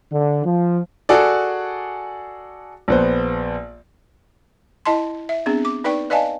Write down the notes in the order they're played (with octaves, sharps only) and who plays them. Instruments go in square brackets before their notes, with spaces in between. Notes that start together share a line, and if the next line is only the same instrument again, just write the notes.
[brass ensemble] D3
F3
[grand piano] F#4 G#4 A4 D5
A#1 B3 C5
[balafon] E4 D#5 A5 C6
E5
B3 C4 D4 G#4
D6
D#4 B4 D5 G5 C#6
B4 D5 D#5 F5 G#5 A5